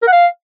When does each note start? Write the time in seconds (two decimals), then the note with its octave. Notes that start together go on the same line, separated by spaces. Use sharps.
0.02 A#4
0.07 F#5
0.12 F5